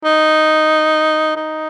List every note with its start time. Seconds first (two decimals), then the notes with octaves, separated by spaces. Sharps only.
0.04 D#4
1.36 D#4